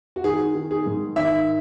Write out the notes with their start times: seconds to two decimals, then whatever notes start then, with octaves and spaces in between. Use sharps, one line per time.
0.16 F#4
0.24 D#3 G#4
0.55 D#3
0.71 G#4
0.86 G#2
1.16 D#3 E5